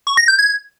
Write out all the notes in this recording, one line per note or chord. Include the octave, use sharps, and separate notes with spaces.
C#6
A#6
G6
G#6